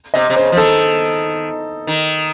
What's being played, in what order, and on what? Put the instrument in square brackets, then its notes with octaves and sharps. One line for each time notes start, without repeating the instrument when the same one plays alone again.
[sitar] C3 [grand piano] D#5
[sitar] C3
[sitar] C#3 [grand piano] C5
[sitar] F3
[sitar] D#3 [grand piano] A4
[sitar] D#3